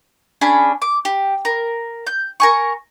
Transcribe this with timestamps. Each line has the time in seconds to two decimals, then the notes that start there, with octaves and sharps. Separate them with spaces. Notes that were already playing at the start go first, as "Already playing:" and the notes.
0.41 C#4 D4 G#4 B5
0.82 D6
1.05 G4
1.45 A#4
2.07 G6
2.40 A#4 G#5 C#6